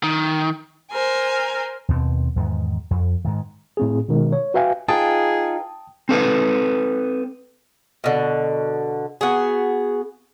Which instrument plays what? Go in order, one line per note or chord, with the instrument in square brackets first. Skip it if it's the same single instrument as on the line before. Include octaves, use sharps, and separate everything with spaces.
[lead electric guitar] D#3
[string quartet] A#4 C5 G#5
[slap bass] D#2 B2 C4
E2 G#2 D#3
F2
G#2 D#3
[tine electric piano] A2 C4 G#4
B2 D#3 G#3
C#5
F#4 B4 E5 F5 G5 G#5
[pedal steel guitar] D#4 F4 B4 [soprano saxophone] G#4 [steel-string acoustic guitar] G5 [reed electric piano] A5 D#6
[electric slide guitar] C4 A4 B4
[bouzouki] B2 D3
B3 F#4 G#4